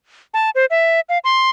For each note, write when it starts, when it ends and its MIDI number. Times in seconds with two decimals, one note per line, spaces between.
0.34 0.50 81
0.55 0.65 72
0.70 1.00 76
1.09 1.18 77
1.24 1.50 84